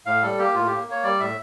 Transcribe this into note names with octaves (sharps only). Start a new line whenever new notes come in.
A2 F5
G3 A4
A#3 G4
A2 F4
A#3 G4
A#3 C#5
G3 D5
A2 E5